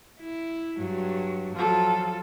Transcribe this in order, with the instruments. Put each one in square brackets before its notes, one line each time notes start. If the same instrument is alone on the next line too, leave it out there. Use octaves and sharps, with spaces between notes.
[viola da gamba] E4
G2 F#3
[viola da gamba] F3 F#3 [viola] F4 A4